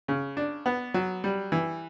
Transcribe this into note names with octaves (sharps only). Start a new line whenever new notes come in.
C#3
D4
B3
F#3
G3
E3